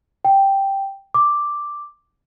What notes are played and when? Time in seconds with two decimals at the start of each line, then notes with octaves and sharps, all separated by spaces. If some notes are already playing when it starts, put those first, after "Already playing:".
0.25 G5
1.14 D6